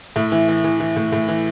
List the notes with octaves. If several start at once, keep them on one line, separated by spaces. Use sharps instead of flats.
A2 E4
E3
E3
E3
E3
A2
A2
E3